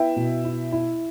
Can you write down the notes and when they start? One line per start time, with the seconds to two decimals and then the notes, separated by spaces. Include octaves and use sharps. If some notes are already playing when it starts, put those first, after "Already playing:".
Already playing: B3 E4 E5 G5
0.16 B2
0.45 E4
0.72 E4